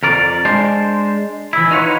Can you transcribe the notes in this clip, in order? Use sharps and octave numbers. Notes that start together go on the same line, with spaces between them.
F2 A#4 D5
G#3 D4 C5
E3 E4
D#4 F4 B4 C#5 F5 F#5